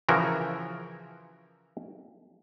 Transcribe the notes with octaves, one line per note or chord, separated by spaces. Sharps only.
C#3 E3 F3 F#4 A#4